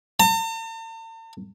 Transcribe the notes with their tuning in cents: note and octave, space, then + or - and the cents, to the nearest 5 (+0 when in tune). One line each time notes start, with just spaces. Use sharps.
A5 +45